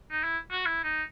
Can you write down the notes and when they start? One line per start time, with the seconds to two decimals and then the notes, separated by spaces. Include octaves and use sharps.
0.10 D#4
0.23 E4
0.51 F#4
0.66 E4
0.84 D#4